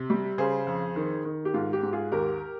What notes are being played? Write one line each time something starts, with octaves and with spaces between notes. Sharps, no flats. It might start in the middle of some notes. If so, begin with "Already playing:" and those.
Already playing: C3
G3
C#3 G#4 C5
F2
D#3
D#3
G4
G#2 F4
G4
G#2
F4 G#4
D#2 G4 A#4